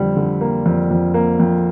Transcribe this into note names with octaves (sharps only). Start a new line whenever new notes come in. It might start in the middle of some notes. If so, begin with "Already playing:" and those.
Already playing: F2 D3 G3
D3
A#3
F2
F2
A#3
F2